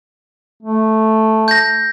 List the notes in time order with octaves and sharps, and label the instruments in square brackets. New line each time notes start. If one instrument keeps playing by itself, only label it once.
[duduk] A3
[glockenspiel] G6 A#6